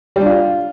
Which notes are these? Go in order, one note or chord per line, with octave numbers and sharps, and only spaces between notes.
G3
D4
F4